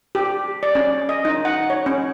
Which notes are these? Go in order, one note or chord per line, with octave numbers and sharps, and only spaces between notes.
G4
D5
C#4
D#5
D#4
F#5
C#5
C#4